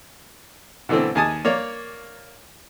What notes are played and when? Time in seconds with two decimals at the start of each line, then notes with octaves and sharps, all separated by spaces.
0.89 B2 D3 E3 A3 C4
1.15 D#2 G#4 G#5 A5 D#6
1.45 A#3 C#5 D5